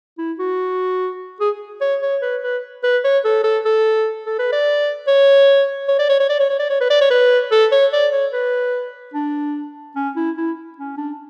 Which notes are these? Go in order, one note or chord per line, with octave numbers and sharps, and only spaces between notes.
E4
F#4
G#4
C#5
C#5
B4
B4
B4
C#5
A4
A4
A4
A4
B4
D5
C#5
C#5
D5
C#5
C#5
D5
C#5
C#5
D5
C#5
B4
D5
C#5
B4
A4
C#5
D5
C#5
B4
D4
C#4
E4
E4
C#4
D4